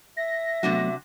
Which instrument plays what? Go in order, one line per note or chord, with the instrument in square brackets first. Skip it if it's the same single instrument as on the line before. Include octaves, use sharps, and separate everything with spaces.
[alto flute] E5 [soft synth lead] A#6
[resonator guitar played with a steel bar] C3 D4 F#4 [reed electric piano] F#3 A3 B3